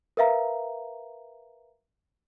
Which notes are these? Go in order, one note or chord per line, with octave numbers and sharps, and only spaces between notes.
A#4 B4 E5 F5 A#5